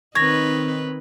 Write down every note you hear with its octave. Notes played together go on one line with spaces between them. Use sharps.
D#3 C4 D#4 B4 C#5 G#6 A#6